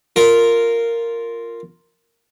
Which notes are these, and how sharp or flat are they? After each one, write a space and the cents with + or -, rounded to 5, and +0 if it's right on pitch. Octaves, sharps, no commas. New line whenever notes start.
F4 +0 A#4 -10